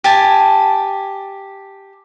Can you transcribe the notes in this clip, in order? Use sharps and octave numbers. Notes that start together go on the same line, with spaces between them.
G4 G#5 A5